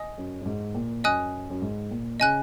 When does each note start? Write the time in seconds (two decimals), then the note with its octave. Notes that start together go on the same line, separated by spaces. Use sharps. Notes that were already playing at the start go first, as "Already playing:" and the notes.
Already playing: D#5 G#5 D#6
0.18 F#2
0.41 F#2
0.46 G#2
0.75 A#2
1.04 F#2 D#5 G#5 D#6 F#6
1.50 F#2
1.62 G#2
1.91 A#2
2.20 C#3 D#5 G#5 F#6